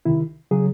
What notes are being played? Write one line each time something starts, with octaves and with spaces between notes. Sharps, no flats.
C2 C3 D#3 E4
C#3 F#3 G#4